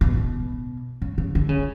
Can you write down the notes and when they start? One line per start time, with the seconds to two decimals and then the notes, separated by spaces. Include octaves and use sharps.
0.01 B2
0.17 B2
1.02 C#3
1.18 C#3
1.35 D3
1.49 C#3